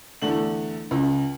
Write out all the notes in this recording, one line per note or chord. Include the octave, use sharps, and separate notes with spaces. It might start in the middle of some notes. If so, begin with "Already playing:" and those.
E2 D3 A3 F#7
C#2